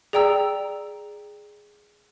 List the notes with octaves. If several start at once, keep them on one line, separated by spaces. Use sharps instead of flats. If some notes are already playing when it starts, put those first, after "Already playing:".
G#4 D5 G5 A#5 E6